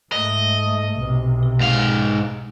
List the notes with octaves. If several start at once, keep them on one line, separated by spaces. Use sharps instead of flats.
G#2 A3 D#5
B1 C3
G#2 F5